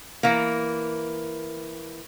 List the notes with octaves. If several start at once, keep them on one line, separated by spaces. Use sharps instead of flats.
E3 A#3